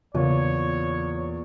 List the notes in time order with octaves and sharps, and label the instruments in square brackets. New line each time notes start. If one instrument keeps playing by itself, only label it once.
[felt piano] E2 [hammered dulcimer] A#2 [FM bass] C#3 [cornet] C#5